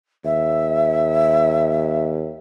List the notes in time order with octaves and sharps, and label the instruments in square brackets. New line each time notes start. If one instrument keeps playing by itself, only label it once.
[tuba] D#2 [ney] E5